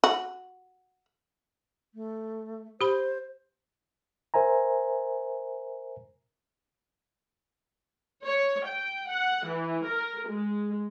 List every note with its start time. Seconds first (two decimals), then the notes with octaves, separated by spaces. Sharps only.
0.04 F#4
1.94 A3
2.81 G4 C5 B5
4.34 A#4 C5 E5 G#5 A#5
8.24 C#5
8.66 G5
9.08 F#5
9.47 E3
9.86 A#4
10.28 G#3